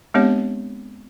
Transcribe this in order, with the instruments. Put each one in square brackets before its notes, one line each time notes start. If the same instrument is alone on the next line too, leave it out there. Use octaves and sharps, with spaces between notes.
[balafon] G#3 B3 C4 D4 G4 C#5